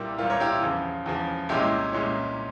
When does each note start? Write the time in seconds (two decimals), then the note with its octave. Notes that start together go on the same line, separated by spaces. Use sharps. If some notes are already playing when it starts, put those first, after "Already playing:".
Already playing: C2 A#2 G3 A#3 E4 G4
0.18 C2 A#2 G3 A#3 F4
0.30 A#4 C#5
0.40 E4 G4
0.52 F4
0.62 E2 C#3 F3
1.06 E2 C#3 F3
1.49 C2 A#2 G#3 C#4 E4 G4
1.93 C2 A#2 G#3 C#4